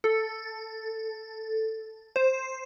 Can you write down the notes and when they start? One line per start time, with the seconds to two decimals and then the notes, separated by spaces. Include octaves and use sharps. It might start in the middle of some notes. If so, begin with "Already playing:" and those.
0.04 A4
2.16 C5